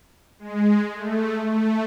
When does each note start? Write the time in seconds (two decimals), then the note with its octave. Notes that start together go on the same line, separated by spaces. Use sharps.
0.39 G#3
0.94 A3
1.48 A3